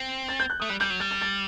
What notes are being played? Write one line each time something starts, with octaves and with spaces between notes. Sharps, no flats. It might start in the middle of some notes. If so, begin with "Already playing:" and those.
Already playing: C4
A6
G6
F#6
A3 D#6
G3 F#6
G3 G6
F#3
G3 A6
A6
A6